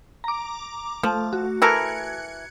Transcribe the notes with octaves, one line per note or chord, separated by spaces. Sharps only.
A#5 D6
F3 A3
F#4
E3 A4 A#4 F#6 G#6 C#7